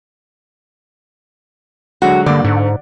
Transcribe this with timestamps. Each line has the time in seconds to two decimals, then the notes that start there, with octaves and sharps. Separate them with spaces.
2.02 D3 F#3 G#3 F#4
2.26 G2 D3 A#3 D5
2.45 G#2 D3